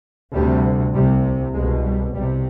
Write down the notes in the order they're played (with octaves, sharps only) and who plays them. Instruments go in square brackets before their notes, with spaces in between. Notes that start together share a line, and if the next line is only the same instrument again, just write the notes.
[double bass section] D2 C3 G3
C2 C3 G3
C2 B2 G#3
G3
C2 C3 G3